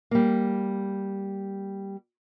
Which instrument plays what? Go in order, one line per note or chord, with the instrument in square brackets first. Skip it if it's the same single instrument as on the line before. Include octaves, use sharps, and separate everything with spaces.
[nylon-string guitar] G3 A#3